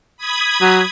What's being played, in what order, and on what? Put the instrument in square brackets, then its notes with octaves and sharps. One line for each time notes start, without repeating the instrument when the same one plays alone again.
[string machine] B5 D#6 G#6
[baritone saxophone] F#3